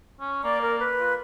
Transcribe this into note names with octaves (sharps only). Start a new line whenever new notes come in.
C#4
A#3 D5
A#4
B4
F4